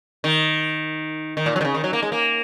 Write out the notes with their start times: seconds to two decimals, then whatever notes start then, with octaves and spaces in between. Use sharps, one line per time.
0.24 D#3
1.37 D#3
1.46 A#2
1.56 F#3
1.61 D#3
1.65 C#3
1.74 D#3
1.84 F#3
1.93 A#3
2.02 G#3
2.12 A#3